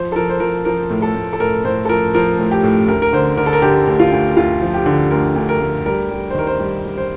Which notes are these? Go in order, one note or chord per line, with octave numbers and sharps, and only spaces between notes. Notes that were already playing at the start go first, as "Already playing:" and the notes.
Already playing: F3 C5
A4
F3 A#4
C5
F3 A#4
F3 A#4
A2
A4
A2
A4
A2 A#4
A2 C5
A4
F3 A#4
F3 A#4
A2
G4
A2
D2 A#4
A#4
D3 C5
D3 A#4
A4
A#4
D3 G4
D2
F4
D2
D2 F4
F3
G4
D3
D2 A#4
D2
A#4
D2
G3 A#4
G3
C5
D#3 A#4
C5
G3
G3
C5